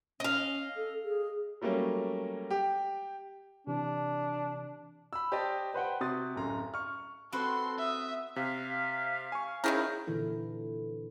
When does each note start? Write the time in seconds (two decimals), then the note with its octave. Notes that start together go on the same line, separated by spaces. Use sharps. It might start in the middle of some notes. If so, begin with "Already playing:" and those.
0.20 C#4 D#5 F5
0.76 A4
1.05 G#4
1.62 F#3 G3 A3 A#3 C#4
2.51 G4
3.67 C3 E3 D4
5.13 B5 E6
5.32 G4 C5 D5 D#5 A5
5.74 B4 C5 F#5 G5
6.01 C3 F#4 C6 D#6 A6
6.36 D1 F#2 A#5 C6
6.74 C#6 F6
7.32 C4 F#4 A4 B4 C6
7.78 E5 D#6
8.36 C3 F5 B6
9.32 G#5 C#6
9.64 D#3 F#3 C#4 E4 G#4 A#4 G6
10.07 A#2 D3 E3 E4